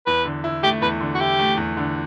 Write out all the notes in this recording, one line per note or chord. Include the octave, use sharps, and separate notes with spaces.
E2 B4
D3
E4
A3 G4
E2 B4
D3
F#4
E4 G4
A3
E2
D3